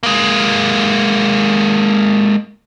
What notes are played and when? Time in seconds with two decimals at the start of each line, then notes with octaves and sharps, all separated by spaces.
0.03 G#3 A#3